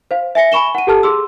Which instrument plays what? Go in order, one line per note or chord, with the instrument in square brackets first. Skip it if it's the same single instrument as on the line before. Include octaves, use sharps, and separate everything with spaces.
[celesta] C5 F5
E5 G#5 A#6 C#7
G#5 B5 C#6 E7 G7
F#5 D#7
G4 A4 A5 F6
G#4 C6 E6